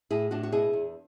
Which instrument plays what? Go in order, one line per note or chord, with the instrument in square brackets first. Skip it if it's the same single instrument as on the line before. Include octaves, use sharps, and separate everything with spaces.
[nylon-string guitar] A2 E4 G#4
A2 D4 F#4
F#4
B2 E4 G#4
E2